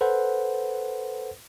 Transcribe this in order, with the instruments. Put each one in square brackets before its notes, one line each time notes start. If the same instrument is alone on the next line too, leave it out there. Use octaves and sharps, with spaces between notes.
[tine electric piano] A4 B4 C5 F#5